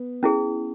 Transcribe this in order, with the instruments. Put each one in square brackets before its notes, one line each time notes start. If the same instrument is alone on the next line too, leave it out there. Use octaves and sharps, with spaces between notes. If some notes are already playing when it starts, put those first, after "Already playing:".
Already playing: [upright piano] B3
[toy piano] C#4 E4 G#4